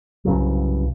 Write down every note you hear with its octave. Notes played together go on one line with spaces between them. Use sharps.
C2 G2 C#3 F#3